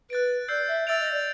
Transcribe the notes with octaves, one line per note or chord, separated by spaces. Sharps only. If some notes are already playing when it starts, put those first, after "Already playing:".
B4 F#6 A6 D7
D5 E6 G6 C7
E5
E5 E6 A6 D7 F7
D#5
D5